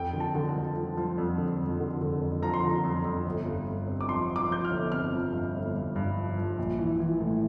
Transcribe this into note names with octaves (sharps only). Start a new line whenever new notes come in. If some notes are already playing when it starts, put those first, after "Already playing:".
Already playing: F2 G5
D3
A5
D3
A5
F3
F3
F3
F2
D3
F2
D3
D3
F2
F3 A#5
C6
D3 A#5
F2
F2
G1
G2
G1
C4
D6
F3 C6
F3
D6
F3 G6
F6
G1
C4 F6
F3
G2
G1
G2
G2
F3
F3
A#1
E3
E3
A2